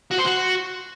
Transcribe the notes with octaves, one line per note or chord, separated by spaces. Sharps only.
F#4
C5
F#4